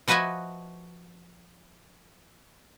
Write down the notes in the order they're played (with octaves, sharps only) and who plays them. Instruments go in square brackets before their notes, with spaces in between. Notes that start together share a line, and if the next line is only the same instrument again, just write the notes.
[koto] F3 F#4 B4 D#5 E5 G#5